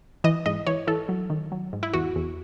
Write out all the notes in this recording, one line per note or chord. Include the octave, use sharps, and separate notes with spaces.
E3 D#5
G#2 D#5
E3 C#5
E3 A4
F#3
D#3
F#3
G#2
E4
E2 F#4
E2